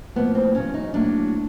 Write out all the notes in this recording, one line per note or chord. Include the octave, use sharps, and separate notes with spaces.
A2 F3 A#3 B3
C4
E2 C#3 F#3 C#4
D#4
A2 F#3 A#3 D4